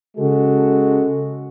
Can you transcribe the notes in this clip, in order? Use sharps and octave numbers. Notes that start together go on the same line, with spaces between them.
C#3 G#3 F#4 A4